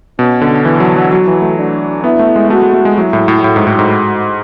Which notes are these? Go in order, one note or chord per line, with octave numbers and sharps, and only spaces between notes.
B2 C#4
D3
E3 D4
F#3
F#3
F#3 F#4
E3
A3
D4
B3 E4
A3
G#3
A3 F#4
G#3
A3
G#3
F#3 E4
A2
A2
A2 F#4
G#2
A2
G#2